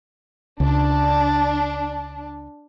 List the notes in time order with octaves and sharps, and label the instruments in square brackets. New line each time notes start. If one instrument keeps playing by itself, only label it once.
[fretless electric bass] C#2 [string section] D4